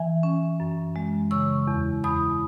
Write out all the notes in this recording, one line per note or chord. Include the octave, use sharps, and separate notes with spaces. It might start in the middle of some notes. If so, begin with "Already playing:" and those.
Already playing: E3 E5 G#5
C#4
F#2
G#3
C#3 C#6 E6
E2
E2 B5 D#6